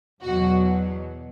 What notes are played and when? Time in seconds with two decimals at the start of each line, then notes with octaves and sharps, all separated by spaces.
0.22 E2 B2 F#3 F#4